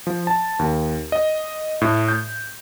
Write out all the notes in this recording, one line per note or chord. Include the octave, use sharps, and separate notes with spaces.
F3
A5
D#2
D#5
A2
G6